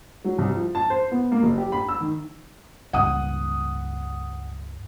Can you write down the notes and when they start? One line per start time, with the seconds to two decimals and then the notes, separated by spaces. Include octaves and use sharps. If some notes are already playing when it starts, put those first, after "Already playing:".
0.24 F#3
0.38 C2
0.55 F3
0.75 A5
0.90 C5
1.11 B3
1.32 A#3
1.43 F#1
1.58 G4
1.72 B5
1.89 E6
2.00 D#3
2.93 C#2 G2 F#5 D#6